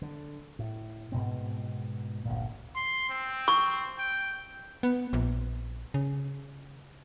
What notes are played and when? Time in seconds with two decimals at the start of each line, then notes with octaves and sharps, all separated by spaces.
0.02 D3
0.59 A2
1.12 G#2 B2 C4
2.25 G1 D2 A#2
2.75 C6
3.10 C4
3.48 C#6
3.99 G5
4.83 B3
5.13 A#1
5.94 C#3